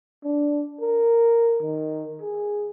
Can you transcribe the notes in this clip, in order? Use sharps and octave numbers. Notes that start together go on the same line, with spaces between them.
D4
A#4
D#3
G#4